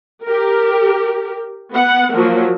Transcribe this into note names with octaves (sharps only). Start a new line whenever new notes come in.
G4 A#4
B3 F#5
F3 F#3 A#3